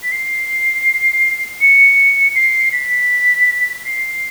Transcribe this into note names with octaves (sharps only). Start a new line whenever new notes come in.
B6
C7
C#7
C7
B6
C7